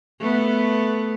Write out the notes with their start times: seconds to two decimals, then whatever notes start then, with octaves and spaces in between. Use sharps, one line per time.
0.20 A3 B3